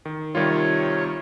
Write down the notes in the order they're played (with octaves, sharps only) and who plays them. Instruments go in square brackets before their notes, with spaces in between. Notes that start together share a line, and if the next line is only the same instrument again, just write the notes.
[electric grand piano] D#3
[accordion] C3 C#5 [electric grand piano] D#3 G3 F4